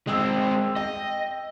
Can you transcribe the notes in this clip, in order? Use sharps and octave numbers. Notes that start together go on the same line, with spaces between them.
G#3 C4 D#5 G5 E6
D#5 G5